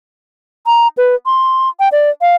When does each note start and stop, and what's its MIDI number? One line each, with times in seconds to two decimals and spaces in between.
0.66 0.88 82
0.97 1.15 71
1.26 1.69 84
1.80 1.89 79
1.92 2.10 74
2.21 2.36 77